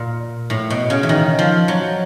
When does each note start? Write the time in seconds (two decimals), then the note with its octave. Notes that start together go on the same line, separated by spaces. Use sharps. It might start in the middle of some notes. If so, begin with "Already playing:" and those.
Already playing: A#2
0.50 A2
0.70 B2
0.90 C#3
1.03 E3
1.09 D#3
1.39 F3
1.68 F#3